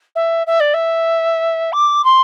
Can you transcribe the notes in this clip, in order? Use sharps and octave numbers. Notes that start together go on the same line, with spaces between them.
E5
E5
D5
E5
D6
C6